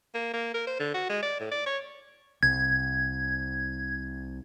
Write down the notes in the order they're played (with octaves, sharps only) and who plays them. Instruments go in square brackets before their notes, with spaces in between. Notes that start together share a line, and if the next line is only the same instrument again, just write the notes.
[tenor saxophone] A#3
A#3
A#4
C5
D3
F#4
G#3
D5
A2
D5
C#5
[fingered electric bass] C2 [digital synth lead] G#6